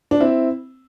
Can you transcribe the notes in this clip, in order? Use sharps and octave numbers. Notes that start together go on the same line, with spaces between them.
D4
C4 E4